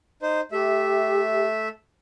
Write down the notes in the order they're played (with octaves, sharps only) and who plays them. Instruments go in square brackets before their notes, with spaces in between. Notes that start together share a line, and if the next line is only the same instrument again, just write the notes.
[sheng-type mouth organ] D#4 C5
[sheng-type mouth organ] A3 E5 [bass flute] G4